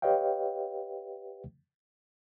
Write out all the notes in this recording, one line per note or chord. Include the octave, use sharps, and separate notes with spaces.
G4 B4 C#5 D#5 F5 G5